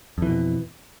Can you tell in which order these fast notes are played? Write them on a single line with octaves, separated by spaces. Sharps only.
F2 E3 B2